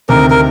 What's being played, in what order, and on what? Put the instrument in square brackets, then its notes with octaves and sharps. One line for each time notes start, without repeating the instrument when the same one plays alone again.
[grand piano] D2 C3 D#3 [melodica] A#4
[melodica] A#4